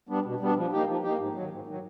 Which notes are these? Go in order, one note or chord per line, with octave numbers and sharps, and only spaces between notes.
G3 B3 D4
B2
G3 B3 D4
F3
A#3 D#4 G4
F3
A#3 D#4 G4
G#2
D#3 F#3
G#2
D#3 F#3